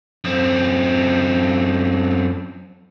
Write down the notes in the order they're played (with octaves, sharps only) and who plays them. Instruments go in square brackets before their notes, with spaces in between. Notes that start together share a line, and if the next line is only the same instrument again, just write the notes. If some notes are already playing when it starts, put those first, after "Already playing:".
[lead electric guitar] F#2 C4